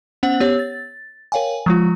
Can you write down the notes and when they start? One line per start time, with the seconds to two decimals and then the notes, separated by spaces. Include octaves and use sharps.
0.23 B3 C#4 C5 F#5 F#7
0.40 B3 G4 C#5
0.59 A6
1.32 A#4 C#5 F5 G5 G#5
1.66 F3 G#3 F4